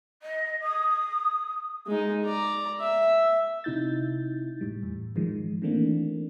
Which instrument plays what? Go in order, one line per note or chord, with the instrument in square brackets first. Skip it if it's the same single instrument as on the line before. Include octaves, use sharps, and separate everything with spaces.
[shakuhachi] D#5
D#6
[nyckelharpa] G#3 D#4
D5 A#5
E5
[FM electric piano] C3 D#4 E4 G6 A6
G1 A2 G3
E2 A2
G#2 D#3 F3 G#3
D#3 E3 A3 A#3 C4 D4